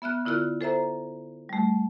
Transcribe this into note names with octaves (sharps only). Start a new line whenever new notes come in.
B3 E5 F6 F#6
D3 E4 F4 F6 F#6
A4 C5 E5 A#5
G3 A3